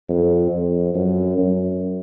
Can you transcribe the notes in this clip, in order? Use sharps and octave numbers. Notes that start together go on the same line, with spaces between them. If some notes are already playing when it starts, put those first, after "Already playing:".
F2
F2
F#2
F#2